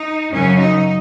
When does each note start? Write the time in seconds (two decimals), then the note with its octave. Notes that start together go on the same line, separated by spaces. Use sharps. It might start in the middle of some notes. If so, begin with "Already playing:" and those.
Already playing: D#4
0.32 F#2 C#3 F#3 C#4
0.60 D#4